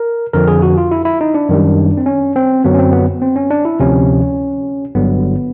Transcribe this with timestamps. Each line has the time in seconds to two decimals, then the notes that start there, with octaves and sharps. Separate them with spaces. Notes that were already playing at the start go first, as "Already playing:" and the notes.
Already playing: A#4
0.33 F2 D3 F3 A#4
0.47 G#4
0.62 F#4
0.78 F4
0.91 E4
1.05 E4
1.21 D#4
1.34 D4
1.49 F#2 D#3 G3
1.97 C4
2.06 C#4
2.36 C4
2.64 F#2 D3 F#3 B3
2.74 C#4
2.79 C4
2.93 B3
3.22 C4
3.36 C#4
3.50 D4
3.65 E4
3.80 D2 C3 F3 C#4
4.95 G1 G2 D3 F#3 B3